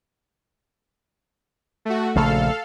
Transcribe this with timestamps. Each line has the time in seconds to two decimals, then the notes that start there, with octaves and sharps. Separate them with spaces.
1.85 A3 F#4
2.16 A#1 C#3 A3 A4 F5